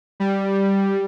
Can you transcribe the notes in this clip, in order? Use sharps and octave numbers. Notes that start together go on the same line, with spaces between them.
G3